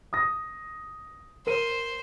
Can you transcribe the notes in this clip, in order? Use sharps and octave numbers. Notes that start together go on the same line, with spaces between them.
D#6 A#6
A#4 C5 D#7